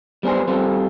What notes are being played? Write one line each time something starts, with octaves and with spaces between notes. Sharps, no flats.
G3 B3 D4 G#4 C5
G3 C4 F4 A4